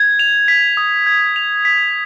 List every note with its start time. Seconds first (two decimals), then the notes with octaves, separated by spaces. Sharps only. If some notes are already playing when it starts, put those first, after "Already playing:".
Already playing: G#6
0.19 F7
0.48 B6
0.77 D#6
1.06 G#6
1.36 F7
1.65 B6